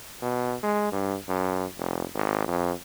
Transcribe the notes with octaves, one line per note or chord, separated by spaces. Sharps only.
B2
G#3
G2
F#2
F1
G#1
F2